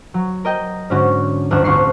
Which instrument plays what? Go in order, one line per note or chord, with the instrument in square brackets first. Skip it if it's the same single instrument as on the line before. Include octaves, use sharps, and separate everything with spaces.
[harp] F#3
A#4 D#5 G5
G#2 D3 C#4 F#4
G1 D2 F#6 E7
A1 D2 C4 C#6 C7